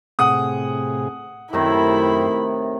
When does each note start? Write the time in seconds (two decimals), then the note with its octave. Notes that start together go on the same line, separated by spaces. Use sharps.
0.19 A2 C3 G#4 F#5 D#6
1.53 F#2 A2 C3 D#3 E4 G4 C5 B5